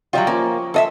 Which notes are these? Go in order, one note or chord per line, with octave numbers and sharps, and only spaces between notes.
F#3 G3 F4 D#5 E5 G5
F3 A#3 C#4
A4 D#5 E5 C6 E6